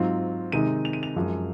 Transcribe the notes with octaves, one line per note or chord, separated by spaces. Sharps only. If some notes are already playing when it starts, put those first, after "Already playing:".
Already playing: G#2 F#3 C4 F4
C3 D#3 G#3 C4 D#4 D#7
F7
D#7
F7
F#2 F3 G#3